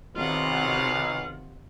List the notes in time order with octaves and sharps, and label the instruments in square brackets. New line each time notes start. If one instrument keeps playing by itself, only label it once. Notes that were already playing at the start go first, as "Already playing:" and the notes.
[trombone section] B1 [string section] C3 D#3 [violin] F4 F#5 [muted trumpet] F5